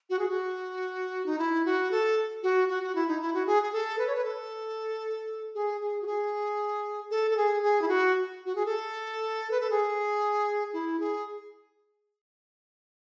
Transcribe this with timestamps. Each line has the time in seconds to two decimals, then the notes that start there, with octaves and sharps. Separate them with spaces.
0.10 F#4
0.19 G#4
0.28 F#4
1.26 D#4
1.39 E4
1.65 F#4
1.91 A4
2.43 F#4
2.69 F#4
2.83 F#4
2.95 E4
3.08 D#4
3.21 E4
3.34 F#4
3.47 G#4
3.63 G#4
3.73 A4
3.99 B4
4.07 C#5
4.15 B4
4.25 A4
5.55 G#4
5.81 G#4
6.02 F#4
6.07 G#4
7.11 A4
7.31 A4
7.37 G#4
7.63 G#4
7.82 E4
7.88 F#4
8.46 F#4
8.55 G#4
8.66 A4
9.51 B4
9.61 A4
9.70 G#4
10.73 E4
11.00 G#4